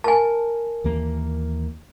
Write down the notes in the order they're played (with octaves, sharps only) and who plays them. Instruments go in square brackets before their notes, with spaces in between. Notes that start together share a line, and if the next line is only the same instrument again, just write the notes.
[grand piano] A#4 [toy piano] G#5 A5
[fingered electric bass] D#2 E3 A#3